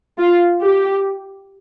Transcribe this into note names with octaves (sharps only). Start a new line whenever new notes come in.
F4
G4